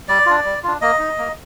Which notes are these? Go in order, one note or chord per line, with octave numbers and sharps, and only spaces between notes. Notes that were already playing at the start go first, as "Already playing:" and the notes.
G3 D5
D4 F4
G3
D4 F4
A#3 D#5
D#4
A#3